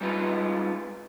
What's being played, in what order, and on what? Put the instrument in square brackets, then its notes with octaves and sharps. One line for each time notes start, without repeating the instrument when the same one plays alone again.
[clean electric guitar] G3 G#3 D#4 F4 B4